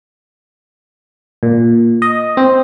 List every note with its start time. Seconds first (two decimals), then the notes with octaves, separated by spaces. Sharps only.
1.43 A#2
2.02 D#5
2.37 C4